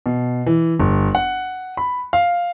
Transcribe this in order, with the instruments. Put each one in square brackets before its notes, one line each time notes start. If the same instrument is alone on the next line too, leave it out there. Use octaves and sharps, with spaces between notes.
[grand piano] B2
E3
G1
F#5
B5
F5